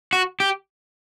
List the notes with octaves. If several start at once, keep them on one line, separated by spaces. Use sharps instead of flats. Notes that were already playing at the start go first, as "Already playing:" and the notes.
F#4
G4